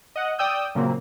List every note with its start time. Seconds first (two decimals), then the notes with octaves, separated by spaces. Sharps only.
0.16 D#5 F#5
0.39 D5 G5 D#6 E6 G6
0.75 A#2 C#3 F#3 A#3 C4